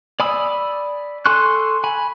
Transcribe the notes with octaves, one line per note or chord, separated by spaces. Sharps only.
D5 G#5 B5 D#6 E6
A4 G#5 C6 C#6 F#6
G#5 B5